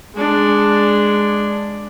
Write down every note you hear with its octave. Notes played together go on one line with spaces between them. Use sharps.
G#3 D4